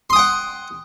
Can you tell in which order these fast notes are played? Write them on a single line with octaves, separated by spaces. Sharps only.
C6 D#6 G5 F#5